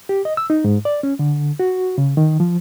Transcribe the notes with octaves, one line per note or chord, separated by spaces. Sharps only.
G4
D#5
E6
D#4
G#2
D5
C#4
D3
F#4
C#3
D#3
F3